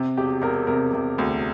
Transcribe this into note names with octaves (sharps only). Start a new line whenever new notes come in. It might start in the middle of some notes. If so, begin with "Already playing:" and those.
Already playing: C3
E1 G4
E1 A#4
C3 A#4
C3
D2